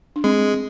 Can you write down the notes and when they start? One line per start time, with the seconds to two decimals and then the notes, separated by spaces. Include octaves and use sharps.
0.16 D4
0.24 G#3 C4